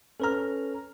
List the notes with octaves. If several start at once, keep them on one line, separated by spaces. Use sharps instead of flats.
C#4 A4 B4 A#5 F6